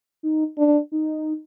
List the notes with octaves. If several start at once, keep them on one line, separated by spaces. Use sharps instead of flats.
D#4
D4
D#4